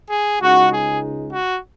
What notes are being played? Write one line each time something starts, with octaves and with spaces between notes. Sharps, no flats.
G#4
C#2 C#3 G#3 D#4 F#4
G#4
F#4